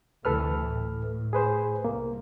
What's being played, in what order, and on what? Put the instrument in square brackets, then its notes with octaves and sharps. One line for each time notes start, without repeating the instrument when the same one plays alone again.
[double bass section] D2 C3 E3 [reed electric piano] A4 B4 F6
[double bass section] A2
[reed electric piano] G#4 B4 C5
[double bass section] C2 [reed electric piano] A#3